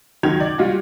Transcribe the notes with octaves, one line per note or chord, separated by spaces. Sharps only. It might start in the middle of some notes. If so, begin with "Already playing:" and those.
C#2 D#3 F#3 G6 G#6 F7
D5
G3 F4 F#4